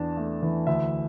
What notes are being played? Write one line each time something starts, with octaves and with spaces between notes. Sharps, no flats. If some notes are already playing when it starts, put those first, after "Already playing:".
Already playing: E2 D4 A5
A3
E3
D2 E5